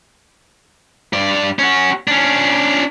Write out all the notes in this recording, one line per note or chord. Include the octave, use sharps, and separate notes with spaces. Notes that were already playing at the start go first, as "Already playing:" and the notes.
G2 D5
C#4 F#4
C#4 D4